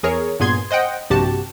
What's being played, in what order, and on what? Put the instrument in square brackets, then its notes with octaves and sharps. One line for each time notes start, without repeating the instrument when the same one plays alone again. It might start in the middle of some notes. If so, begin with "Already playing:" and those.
[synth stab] E2 G#4 A#4 C#5
G2 A#2 B3 G#4 C6 G#6
C5 D#5 F#5 G5
A#1 G2 C3 F#4 G4 A5